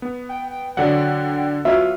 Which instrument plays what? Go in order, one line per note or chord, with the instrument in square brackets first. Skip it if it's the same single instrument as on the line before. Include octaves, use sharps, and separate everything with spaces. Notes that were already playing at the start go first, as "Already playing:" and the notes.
[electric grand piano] B3
[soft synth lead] G5
[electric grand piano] D3 F#5 [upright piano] F#3 F#4 D5
[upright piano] F#3 B3 F4 [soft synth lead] F#4 [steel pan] E5